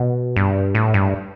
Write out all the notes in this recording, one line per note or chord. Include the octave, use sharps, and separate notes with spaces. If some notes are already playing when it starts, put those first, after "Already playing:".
Already playing: B2
G2
A2
G2